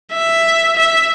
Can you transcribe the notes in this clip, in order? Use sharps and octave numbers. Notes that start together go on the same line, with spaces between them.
E5
E5